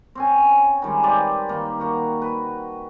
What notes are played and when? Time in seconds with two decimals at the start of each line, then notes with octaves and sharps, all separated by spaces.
0.15 C4 C#4 G#5
0.82 D#3 G3 G#3
1.03 G4 B4 C5 D5
1.49 D#3 A#3
1.80 A#3 F#4 A#5
2.22 B4